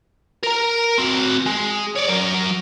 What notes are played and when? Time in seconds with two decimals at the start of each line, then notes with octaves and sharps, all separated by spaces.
0.43 A#4 A#5
0.98 C4 F#4
1.46 G#3
1.95 C#5 D5
2.08 F#3 A#4